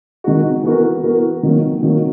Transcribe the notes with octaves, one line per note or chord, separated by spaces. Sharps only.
D#3 G#3 D#4 F#4
E3 B3 F#4 A#4
E3 B3 F#4 A#4
D#3 F#3 A#3
D#3 F#3 A#3